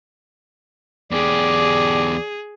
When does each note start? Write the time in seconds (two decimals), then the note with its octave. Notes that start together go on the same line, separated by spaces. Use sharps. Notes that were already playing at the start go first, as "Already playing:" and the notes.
1.12 E2 G4 G#4 D5